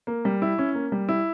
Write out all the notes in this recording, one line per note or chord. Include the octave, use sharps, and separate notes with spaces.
A#3
G3
E4
C#4
A#3
G3
E4